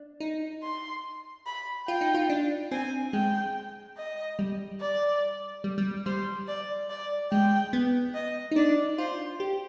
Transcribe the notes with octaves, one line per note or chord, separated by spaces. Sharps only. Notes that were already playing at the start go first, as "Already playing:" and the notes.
Already playing: D4
D#4
C6
B5
F4 G5
D#4
F4
D4
C4 G#5
G#3 G5
D#5
G3
D5
G3
G3
G3 C5
D5
D5
G#3 G5
B3
D#5
D#4
D4 D5
F4 C5
G4